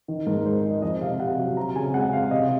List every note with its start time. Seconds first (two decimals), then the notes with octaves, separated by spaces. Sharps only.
0.08 D#3
0.27 G#2 A#4
0.45 G#3 C5
0.64 G#3
0.70 D#5
0.82 F2 D#5
1.01 C3 F5
1.19 C3 F#5
1.38 F#3
1.57 C4 A#5
1.76 C#3 G#5
1.94 G#3 F#5
2.13 C4 F5
2.31 C3 D#5